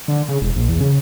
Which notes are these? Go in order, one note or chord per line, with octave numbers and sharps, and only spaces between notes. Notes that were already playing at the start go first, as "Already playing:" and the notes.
D3
C#3
E1
A#1
E2
C#3